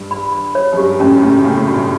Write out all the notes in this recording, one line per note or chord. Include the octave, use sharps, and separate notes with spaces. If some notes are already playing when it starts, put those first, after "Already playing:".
Already playing: G2
B5
B5
C#5
F#2
G2 G4
F#2 A2 C#4
A2 C#3 C#4
A2 C#3 G5
A2
G2 B2 F#4